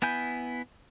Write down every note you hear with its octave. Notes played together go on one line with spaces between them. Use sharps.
B3 E4 G#5 G6